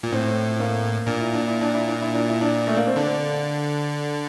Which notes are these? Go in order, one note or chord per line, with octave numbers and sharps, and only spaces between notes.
A#2
A2 C4
A#3
A#2 D4
E4
D4
E4
D4
E4
D4
E4
D4
E4
D4
A3
A#3
C4
D3 D4